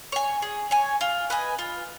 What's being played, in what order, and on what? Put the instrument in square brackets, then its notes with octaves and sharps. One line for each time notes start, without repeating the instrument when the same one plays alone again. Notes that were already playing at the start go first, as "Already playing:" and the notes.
[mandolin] C#5 G#5
G#4
C#5 G#5
F4
B4 D#5 G#5
F4